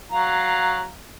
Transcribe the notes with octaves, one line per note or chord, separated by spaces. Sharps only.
F#3 F5 A#5